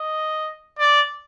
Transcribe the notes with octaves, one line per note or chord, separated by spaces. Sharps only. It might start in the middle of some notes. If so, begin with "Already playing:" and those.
Already playing: D#5
D5